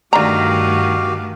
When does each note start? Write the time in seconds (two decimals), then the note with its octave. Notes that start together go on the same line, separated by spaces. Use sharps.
0.13 G2 D3 D#3 A3 F#4 G4 F5 A#5